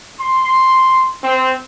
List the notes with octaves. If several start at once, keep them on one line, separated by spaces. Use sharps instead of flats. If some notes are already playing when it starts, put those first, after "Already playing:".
C6
C4